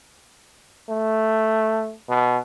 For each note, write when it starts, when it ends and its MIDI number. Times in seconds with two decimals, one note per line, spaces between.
0.89 1.94 57
2.09 2.38 47